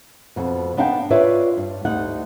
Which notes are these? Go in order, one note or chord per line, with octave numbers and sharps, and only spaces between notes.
F2 B2
B3 D4 D#4 F5 G5
D4 F4 B4 C#5 D5 E5
G2
D2 G3 D#4 F#5